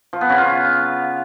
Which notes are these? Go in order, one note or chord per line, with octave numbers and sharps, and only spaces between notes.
F3
B3
C#3
F4